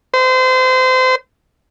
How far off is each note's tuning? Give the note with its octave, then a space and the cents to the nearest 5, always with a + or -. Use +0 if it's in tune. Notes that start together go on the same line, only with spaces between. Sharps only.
C5 -30